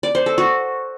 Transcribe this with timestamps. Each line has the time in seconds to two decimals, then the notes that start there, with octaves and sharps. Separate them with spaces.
0.03 D5
0.15 C5
0.26 A4
0.38 F#4